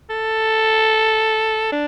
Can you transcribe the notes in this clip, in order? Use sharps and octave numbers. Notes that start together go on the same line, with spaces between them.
A4
D4